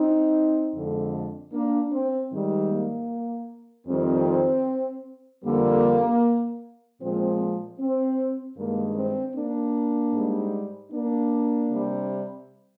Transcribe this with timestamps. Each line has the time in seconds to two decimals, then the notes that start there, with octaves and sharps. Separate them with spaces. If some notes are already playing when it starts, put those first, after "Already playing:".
Already playing: C4 D#4
0.74 F2 D3 G#3
1.52 A#3 D4
1.92 C4
2.31 G#2 D#3 G3
2.70 A#3
3.87 F2 D#3 G3 C4
5.43 F2 D3 G3 A#3
6.99 A#2 F3 G#3 C4
7.78 C4
8.56 G2 D#3 G#3 A#3
8.95 C4
9.34 A#3 D4
10.13 G#2 G3
10.90 A#3 D4
11.69 C3 G3